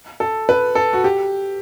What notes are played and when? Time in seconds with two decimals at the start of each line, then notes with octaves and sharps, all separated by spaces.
0.20 A4
0.49 B4
0.75 A4
0.93 F#4
1.04 G4